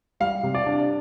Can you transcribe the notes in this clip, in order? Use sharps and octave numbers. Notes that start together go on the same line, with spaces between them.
G3 F5
C3
D5
D4